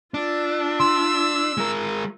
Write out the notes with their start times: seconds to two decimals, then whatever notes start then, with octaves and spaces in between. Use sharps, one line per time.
0.14 D4 F4 E5
0.80 C6 E6
1.57 G#3 A#4